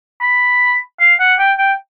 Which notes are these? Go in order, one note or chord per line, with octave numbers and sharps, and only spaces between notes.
B5
F5
F#5
G5
G5